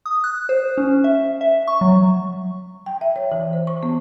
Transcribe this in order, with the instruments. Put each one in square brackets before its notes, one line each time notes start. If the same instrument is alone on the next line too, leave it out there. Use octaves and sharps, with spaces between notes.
[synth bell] D#6
F#6
C5
C#4
E5
E5
C#6
F#3
[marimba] G5
E5
C#5
E3
C5
C#6
B3